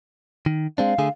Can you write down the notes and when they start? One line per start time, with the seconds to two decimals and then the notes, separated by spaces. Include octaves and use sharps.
0.46 D#3
0.78 G#3 C4 D4 F5
0.99 D3 A3 G#4